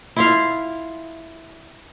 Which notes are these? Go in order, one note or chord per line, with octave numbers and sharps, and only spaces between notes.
E4 F4 F5